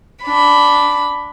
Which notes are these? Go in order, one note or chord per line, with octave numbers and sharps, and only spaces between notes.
D4 B5